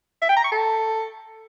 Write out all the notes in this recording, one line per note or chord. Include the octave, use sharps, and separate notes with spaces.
E5
G5
A#5
C#6
A4